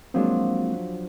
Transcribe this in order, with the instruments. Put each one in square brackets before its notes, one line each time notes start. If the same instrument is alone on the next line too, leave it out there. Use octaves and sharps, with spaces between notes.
[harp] F3 F#3 D4 [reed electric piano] G#3 A#3 C4